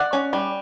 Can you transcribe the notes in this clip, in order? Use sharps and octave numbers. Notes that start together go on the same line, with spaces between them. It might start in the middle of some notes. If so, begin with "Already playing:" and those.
Already playing: D5 F#5
C#4
G3